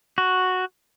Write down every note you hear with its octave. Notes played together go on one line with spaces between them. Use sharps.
F#4